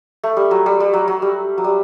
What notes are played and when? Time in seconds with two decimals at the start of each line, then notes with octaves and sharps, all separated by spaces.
0.24 A3
0.37 G3
0.51 F#3
0.66 G3
0.80 G3
0.93 F#3
1.08 F#3
1.22 G3
1.58 F#3
1.64 G3